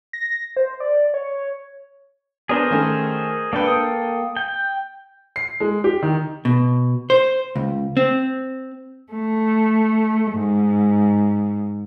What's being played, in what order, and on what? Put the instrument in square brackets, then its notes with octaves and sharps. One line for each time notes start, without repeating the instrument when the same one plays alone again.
[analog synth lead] A#6
C5
D5
C#5
[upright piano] B3 D4 C#5 [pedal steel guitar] G#4 A#4 C5
[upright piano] D#3 A3 C#4
[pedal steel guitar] A#3 A4 G5 [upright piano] D4 B4
[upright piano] D#6
[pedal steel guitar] G5
[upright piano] C7
G#3
G4
D#3
[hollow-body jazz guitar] B2
C5
C#2
C4
[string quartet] A3
G#2